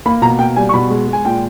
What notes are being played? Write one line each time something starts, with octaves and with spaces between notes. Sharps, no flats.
A#3 B5
B2 A#5
A#3 G5
G3 G#5
C#6
B2 B5
G#3
G#3
G#5
A#2 G5